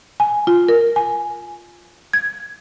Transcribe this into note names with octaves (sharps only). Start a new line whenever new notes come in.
G#5
F4
A#4
G#5
G#6